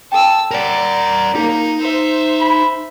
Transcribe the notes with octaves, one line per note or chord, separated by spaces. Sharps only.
A4 G5 A5 E6
A#4 D5 F#5 A#5
A#3 D#4 F4 G#4 C#5
C5 E5
B5